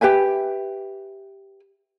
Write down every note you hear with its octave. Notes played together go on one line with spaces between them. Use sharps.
G4 B4 E5 G#5